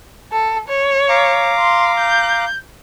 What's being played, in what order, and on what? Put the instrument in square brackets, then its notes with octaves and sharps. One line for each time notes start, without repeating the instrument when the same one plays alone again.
[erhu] A4
C#5
[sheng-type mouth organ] F5 A#5 D6
[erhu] C6
G6